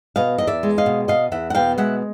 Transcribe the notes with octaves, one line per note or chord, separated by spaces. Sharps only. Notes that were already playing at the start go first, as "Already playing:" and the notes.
B2 D#5 F5
E2 D#5
D5 E5
G#3
D#5 F5
B2
B2 D#5 F5
E2 E5 F#5
F#5
B2 F5 G5
G#3 E5 F#5